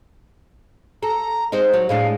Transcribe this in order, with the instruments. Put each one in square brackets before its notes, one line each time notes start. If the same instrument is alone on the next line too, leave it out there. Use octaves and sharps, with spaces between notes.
[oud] A4 [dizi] A#5
[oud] G#3 C4 D#4 [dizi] C5
[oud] F#3
[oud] A2 G#3 D4 [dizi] F5